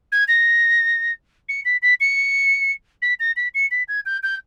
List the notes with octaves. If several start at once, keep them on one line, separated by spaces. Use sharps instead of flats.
G#6
A#6
C#7
B6
B6
C#7
B6
A#6
B6
C#7
B6
G#6
G6
G6